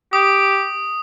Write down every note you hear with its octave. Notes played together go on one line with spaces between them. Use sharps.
G4 D#6